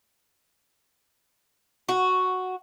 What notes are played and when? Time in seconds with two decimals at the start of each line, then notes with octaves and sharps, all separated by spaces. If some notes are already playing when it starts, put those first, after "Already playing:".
1.89 F#4